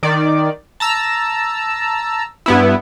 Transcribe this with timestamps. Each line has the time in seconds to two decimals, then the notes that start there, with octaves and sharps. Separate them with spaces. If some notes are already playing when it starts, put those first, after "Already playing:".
0.03 D#3 D5
0.80 A5 A#5 E6
2.46 G2 B3 E4